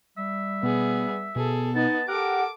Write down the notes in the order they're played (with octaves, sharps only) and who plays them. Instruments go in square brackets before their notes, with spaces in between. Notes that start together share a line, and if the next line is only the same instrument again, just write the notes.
[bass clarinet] G3 [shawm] E5
[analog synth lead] B2 [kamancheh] B3 G#4
[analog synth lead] B2 [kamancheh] G#4 A4
[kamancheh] B3 D#5 [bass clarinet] D#4 [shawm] A5
[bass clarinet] G4 [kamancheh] A4 D6 [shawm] A#4 [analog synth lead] F#5